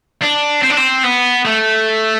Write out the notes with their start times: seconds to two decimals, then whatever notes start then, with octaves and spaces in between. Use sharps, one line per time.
0.22 D4
0.62 C4
0.70 D4
0.78 C4
1.04 B3
1.45 A3